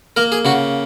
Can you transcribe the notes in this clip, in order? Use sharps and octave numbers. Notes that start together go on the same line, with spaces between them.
A#3 A#4
G#4
C#3 F#4